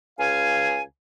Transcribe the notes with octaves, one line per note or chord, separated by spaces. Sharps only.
C#2 F5 G#5